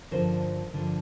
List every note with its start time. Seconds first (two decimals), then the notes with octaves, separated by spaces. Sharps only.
0.11 G2 D3 F3 A#4 C5
0.73 G2 D3 F3